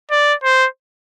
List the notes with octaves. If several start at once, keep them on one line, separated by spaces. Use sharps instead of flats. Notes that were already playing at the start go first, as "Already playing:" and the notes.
D5
C5